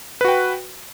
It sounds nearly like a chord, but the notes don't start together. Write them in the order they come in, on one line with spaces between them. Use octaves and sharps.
B4 F#4 G5